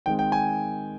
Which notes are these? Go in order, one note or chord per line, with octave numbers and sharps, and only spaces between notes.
D#3 G#3 C4 G5
G5
G#5